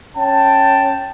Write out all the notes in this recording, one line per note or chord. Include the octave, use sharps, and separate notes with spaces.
C#4 G5 A5